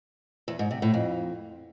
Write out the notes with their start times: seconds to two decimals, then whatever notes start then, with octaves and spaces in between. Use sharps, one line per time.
0.48 E2
0.59 G#2
0.71 C3
0.82 A2
0.94 F2